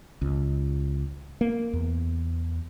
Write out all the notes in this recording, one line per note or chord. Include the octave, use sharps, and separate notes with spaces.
C#2
A#3
E2